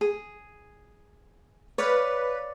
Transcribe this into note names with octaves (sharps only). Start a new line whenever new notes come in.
G#4
B4 C#5 D5 F5